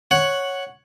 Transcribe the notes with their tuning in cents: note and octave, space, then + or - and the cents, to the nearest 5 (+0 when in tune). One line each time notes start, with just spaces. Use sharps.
C#5 +0 F#5 +0